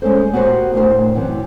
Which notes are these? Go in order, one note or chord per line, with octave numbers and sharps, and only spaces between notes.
G#3 C#4 A4 C5
B3 F#4 G4 A#4 C5
D2 A2 D3 A#4 C5
F#2 C3 E3